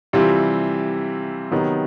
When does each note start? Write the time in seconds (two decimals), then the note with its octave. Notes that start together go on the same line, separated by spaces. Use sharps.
0.13 C3 E3 G3 C4 F4
1.51 C3 D#3 F#3 B3